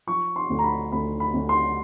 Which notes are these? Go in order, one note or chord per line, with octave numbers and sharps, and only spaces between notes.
F3 C#6
C6
D2
A#5
B5
D2 B5
B5
D2
C6